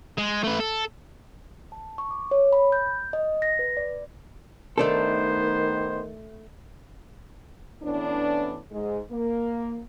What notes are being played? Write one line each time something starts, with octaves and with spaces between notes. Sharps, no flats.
G#3
A3 B4
A4
A5
C#6
D6
C#5
B5
G6
D#5
A#6
B4
D5
D#3 A3 B3 D4 A4 C5
A2 E3 B3 C#4 D4
G#2 G#3
A#3